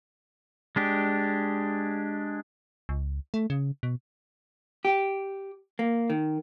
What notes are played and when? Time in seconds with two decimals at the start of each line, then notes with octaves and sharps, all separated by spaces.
0.76 G#3 D4 G4
2.89 C#2
3.34 A3
3.50 C#3
3.83 B2
4.85 G4
5.79 A#3
6.10 D#3